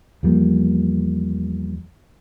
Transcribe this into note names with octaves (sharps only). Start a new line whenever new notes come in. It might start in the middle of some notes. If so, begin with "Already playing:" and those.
E2 F3 G3 A#3